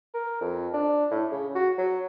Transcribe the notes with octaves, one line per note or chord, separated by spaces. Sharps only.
A#4
F2
D4
A2
C#3
F#4
F#3